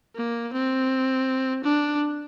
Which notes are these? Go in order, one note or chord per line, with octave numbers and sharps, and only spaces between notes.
A#3
C4
D4